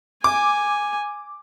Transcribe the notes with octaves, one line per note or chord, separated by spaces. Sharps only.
G#5 D6